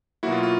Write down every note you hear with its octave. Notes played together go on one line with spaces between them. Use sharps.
B2 F#3 A#3 E4 F#4
F4
F4